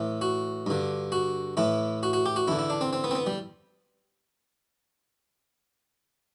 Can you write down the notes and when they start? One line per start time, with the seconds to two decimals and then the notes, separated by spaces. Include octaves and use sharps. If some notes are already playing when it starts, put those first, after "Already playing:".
Already playing: A2 E3
0.21 F#4
0.66 G2 D3
1.12 F#4
1.57 A2 E3 E4
2.03 F#4
2.13 F#4
2.26 G4
2.36 F#4
2.48 E2 D3 E4
2.59 E4
2.70 D4
2.81 C4
2.93 C4
3.04 B3
3.11 C4
3.15 B3
3.27 G3